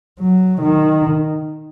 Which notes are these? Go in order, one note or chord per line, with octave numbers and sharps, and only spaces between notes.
F#3
D#3